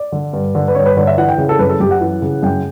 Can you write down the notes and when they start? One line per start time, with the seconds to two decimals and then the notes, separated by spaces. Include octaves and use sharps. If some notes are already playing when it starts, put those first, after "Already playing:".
Already playing: D5
0.12 D3
0.33 G2
0.55 D3
0.68 B4
0.75 G2 C#5
0.86 B4
0.97 D3 C#5
1.07 E5
1.18 E3 F#5
1.29 G5
1.38 C#3
1.49 A4
1.59 F#2 B4
1.69 A4
1.80 F#2 G4
1.91 F#5
2.01 E3
2.22 C#3
2.43 F#2 G5